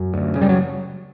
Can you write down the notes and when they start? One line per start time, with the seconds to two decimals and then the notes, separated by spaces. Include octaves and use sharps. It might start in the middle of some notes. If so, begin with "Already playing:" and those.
Already playing: F#2 F#3
0.14 D2
0.35 C#3
0.42 G3
0.49 F#3